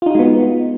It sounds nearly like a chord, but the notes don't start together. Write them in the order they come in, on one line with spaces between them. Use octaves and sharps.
F4 D#4 F#4 G#3 B3